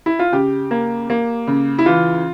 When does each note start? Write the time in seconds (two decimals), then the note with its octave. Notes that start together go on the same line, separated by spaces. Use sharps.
0.06 E4
0.19 F4
0.32 C#3 G4
0.71 A#3
1.10 A#3
1.47 C#3
1.79 E4
1.86 E3 F4